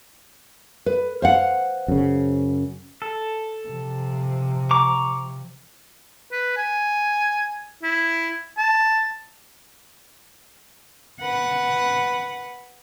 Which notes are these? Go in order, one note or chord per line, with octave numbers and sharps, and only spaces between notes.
B4
C5 F5 F#5
F#2 C#3
A4
C3 F3
A#5 C#6 D6
B4
G#5
E4
A5
B4 F#5